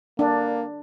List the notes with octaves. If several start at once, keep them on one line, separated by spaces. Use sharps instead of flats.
A#3 D4